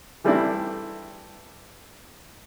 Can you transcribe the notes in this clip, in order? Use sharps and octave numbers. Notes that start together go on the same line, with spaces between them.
E3 G3 A3 C4 D4 E4